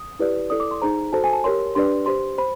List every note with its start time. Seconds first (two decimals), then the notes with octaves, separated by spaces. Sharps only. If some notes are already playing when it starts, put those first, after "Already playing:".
Already playing: D#6
0.19 E4 G4 B4 D5
0.50 E4 A4 D5 D#6
0.60 D6
0.71 C6
0.82 D#4 G#4 C5 A#5
1.13 F#4 A4 C5 A5
1.24 G#5
1.33 A5
1.44 G4 A#4 C#5 C6
1.75 D4 G4 B4 D5 C6
2.06 G4 C5 C6
2.38 C5 B5